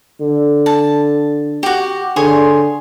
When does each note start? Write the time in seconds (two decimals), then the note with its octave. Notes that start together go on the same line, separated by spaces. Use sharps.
0.20 D3
0.66 A5
1.63 F#4 G4
2.16 D3 G#4 C#5 C6